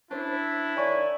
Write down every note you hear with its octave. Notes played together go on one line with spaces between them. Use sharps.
C#4 D4 E4 C5
D#3 C#5 D5 G#5 C#6